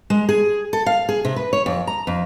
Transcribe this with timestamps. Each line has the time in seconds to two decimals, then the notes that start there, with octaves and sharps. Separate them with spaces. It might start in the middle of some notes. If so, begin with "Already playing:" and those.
0.10 G#3
0.29 G#4
0.73 A4
0.86 F5
1.09 G#4
1.25 C3
1.36 B4
1.53 C#5
1.66 F2
1.87 A#5
2.07 F2